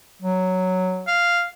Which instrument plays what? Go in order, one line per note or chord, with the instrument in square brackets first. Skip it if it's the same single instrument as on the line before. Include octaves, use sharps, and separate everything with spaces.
[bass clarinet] F#3
[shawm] F5